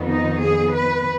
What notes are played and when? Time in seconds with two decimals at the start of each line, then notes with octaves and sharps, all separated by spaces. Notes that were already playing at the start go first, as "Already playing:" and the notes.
Already playing: F2 D#3 B3
0.10 D#4
0.43 G#4
0.75 B4